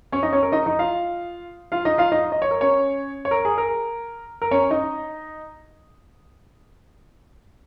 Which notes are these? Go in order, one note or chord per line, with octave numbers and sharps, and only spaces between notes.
C#4 C#5
D#4 D#5
C#4 C#5
A#4
D#4 D#5
D#4 D#5
F4 F5
F4 F5
D#4 D#5
F4 F5
D#4 D#5
D#5
C#5
A#4
C#4 C#5
C#5
A#4
G#4
A#4
A#4
C#4 C#5
D#4 D#5